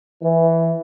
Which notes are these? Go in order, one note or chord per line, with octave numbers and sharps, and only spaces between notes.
E3